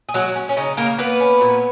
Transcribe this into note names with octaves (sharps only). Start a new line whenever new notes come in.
G#4
F#3 G#3 F#4
C#4
C#4
C#3 D#4
C#3 A#3 A#4
A#3 B3 B4
C#4
A#2